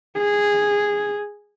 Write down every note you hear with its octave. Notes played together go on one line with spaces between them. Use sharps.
G#4